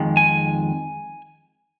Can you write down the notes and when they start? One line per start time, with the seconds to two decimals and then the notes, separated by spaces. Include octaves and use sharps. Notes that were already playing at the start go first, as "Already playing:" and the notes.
Already playing: F2 D#3 G#3
0.17 G#5